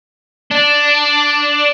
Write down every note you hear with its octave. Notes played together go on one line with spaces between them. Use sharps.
D4